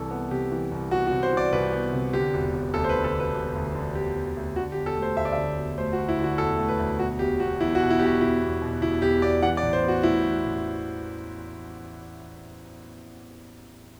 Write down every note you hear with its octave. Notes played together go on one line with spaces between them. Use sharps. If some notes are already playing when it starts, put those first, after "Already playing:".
Already playing: C2 E3 A4
B3
C3 G4
E3
C2
B3 F#4
F#4
C3
C5
E3 D5
C2 B4
B3
C3
D3 G4
E1
E1
D2 A4
C5
B4
D3
A4
E1
B4
E1
D2
D3
E1 G4
E1
D2
D3 F#4
G4
E1
A4
A3
C5
D2 E5
D5
D3 E5
E1
A3 C5
F#4
D2
E4
D3
F#4
E1 A4
A3
B4
D2
B2 F#4
E1 G4
E1 F#4
E2 E4
F#4
B2
E4
E1 G4
F#4
E1 E4
E2
B2
E1 E4
E1 G4
E2 D5
E3 F#5
D5
A1
C5
B3
F#4
A2 E4
E3
A1